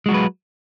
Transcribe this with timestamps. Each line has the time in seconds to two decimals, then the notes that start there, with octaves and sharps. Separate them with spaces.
0.06 G#3
0.09 F#4
0.11 F#3
0.14 B4